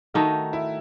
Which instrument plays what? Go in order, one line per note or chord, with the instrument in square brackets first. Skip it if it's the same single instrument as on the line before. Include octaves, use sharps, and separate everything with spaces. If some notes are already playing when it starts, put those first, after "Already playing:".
[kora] D#3 A3 D#4 [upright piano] F#4
[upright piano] E4